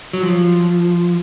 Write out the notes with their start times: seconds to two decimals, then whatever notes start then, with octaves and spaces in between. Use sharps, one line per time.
0.13 F#3
0.23 F3